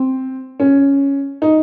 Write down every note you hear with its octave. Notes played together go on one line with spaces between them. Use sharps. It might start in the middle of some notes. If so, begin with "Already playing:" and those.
Already playing: C4
C#4
D#4